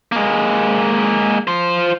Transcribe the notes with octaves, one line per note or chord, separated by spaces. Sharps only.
G#3 A#3
F4 C5